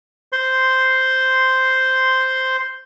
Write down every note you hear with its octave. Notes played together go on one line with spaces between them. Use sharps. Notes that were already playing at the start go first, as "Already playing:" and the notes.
C5 C6